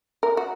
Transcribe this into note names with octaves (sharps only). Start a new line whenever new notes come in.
A#4
F#4